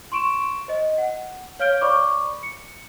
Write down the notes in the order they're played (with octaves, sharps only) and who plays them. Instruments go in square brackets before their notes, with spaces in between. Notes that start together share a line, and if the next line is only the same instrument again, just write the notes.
[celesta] C6 C#6 D7 E7
C5 D#5
F#5
C#5 F5 F6 G6 D7 G7
C5 D5 B5 C#6 D6
C#7